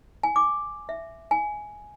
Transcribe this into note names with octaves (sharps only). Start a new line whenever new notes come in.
G#5
D6
E5
G#5